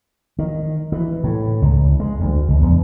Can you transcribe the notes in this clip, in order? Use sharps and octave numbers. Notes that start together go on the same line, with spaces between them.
D#3
E3
A2
C#2
G#3
D2
C#2
E2